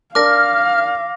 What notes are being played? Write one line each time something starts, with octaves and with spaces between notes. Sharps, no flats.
D4 A#4 D5 F5 D6 F6 A#6